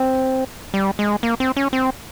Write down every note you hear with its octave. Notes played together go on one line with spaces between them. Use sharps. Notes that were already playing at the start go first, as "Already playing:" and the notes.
Already playing: C4
G3
G#3
A#3
C4
C#4
C4